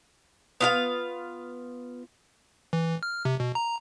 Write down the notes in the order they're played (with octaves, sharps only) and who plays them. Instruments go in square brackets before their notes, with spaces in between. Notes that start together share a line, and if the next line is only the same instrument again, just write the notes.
[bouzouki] B3 F4 F5
[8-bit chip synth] E3
F6
C3
B2
A#5